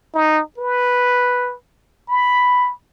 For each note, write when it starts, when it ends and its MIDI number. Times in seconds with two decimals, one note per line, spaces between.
0.14 0.42 63
0.58 1.54 71
2.08 2.72 83